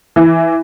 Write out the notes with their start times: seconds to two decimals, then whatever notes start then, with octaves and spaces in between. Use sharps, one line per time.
0.16 E3